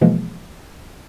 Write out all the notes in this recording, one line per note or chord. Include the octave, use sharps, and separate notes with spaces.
B2 E3 F3 G#3 A#3